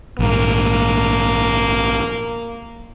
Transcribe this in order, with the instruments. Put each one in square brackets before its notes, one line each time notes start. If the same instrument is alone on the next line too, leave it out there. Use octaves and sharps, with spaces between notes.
[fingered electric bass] A#1 G#2 [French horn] A#3